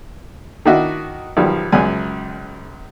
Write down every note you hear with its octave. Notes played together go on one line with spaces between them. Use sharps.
D#3 D4 E4 F#4 D#5 E5
B1 D#3 F3 G3
C#2 F#2 G#5